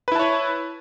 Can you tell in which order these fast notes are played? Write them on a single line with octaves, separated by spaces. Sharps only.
B4 E4 A5 C#5